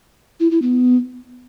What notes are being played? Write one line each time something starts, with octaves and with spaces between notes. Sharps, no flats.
E4
E4
B3